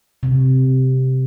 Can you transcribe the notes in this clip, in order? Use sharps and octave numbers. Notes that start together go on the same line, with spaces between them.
C3